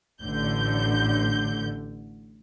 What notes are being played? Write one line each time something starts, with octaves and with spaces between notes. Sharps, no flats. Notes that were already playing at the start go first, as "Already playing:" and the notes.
A1 D3 G6